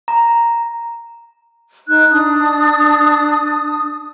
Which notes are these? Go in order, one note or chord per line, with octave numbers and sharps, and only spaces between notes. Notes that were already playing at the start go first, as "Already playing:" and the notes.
A#5
D#4 F#6
D4 D#6